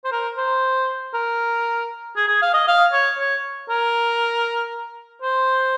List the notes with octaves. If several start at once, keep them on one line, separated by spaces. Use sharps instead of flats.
C5
A#4
C5
A#4
G#4
G#4
F5
D#5
F5
C#5
C#5
A#4
C5